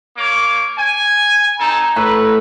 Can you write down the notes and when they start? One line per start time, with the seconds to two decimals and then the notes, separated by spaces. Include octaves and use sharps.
0.16 A#3 C#5 D6
0.78 G#5
1.60 C4 D#4 A4 A#5
1.96 A2 B4